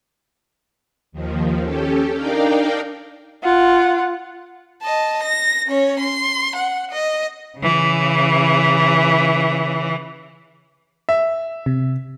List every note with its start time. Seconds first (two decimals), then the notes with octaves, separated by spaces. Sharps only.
1.12 D#2 D#3 F3
1.63 C#4 G4 A4
2.13 D4 D#4 A#4 D5 F5 G5
3.43 F4 F#5
4.83 D#5 A5
5.23 A#6
5.67 C#4 C#5
6.00 C6
6.56 F#5
6.91 D#5
7.58 C#3 E3
11.09 E5
11.66 C3